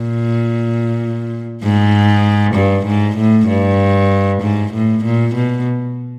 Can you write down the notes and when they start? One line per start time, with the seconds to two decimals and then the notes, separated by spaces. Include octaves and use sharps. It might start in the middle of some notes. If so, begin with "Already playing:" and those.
Already playing: A#2
1.62 G#2
2.55 G2
2.87 G#2
3.18 A2
3.48 G2
4.42 G#2
4.73 A2
5.04 A#2
5.35 B2